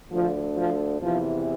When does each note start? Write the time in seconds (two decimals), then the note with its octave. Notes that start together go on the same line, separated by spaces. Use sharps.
0.11 D2 D3 F3
0.55 F3
1.00 E2 C3 E3 F3